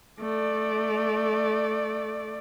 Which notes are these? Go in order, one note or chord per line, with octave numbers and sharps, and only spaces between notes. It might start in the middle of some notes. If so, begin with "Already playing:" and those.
A3 D5